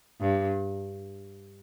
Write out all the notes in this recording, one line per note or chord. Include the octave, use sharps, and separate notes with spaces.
G2